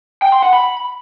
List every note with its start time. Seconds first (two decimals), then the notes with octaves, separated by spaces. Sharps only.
0.22 G5
0.32 C6
0.42 F#5
0.53 B5